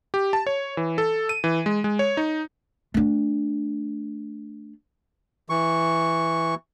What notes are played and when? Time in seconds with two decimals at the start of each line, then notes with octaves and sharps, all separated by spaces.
0.14 G4
0.33 A5
0.47 C#5
0.77 E3
0.98 A4
1.29 D#7
1.44 E3
1.66 G#3
1.84 G#3
1.99 C#5
2.17 D#4
2.94 A3 D4
5.50 E3 C#6